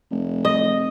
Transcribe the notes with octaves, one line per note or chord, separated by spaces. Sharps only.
F1
D#5